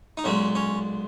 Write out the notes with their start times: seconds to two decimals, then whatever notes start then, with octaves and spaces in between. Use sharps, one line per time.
0.17 D#4
0.24 B1 A#2 G#3 C#4
0.55 C#4